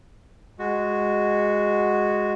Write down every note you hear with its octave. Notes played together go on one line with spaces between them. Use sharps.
G#3 F#4